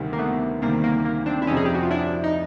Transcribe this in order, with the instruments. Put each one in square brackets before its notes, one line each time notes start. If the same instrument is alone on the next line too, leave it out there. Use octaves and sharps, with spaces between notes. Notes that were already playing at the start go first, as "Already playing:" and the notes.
Already playing: [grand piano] D2 C3 D#3 G3
[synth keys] A#3
A3 B3
[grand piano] D2 C3 D#3 G3 [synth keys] A#3
[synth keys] A#3
A#3
C4 D4
E4
[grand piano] F1 F2 C3 F3 [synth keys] C#4 D#4
[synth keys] G#4
G4
F#4
F4
D4 E4
D#4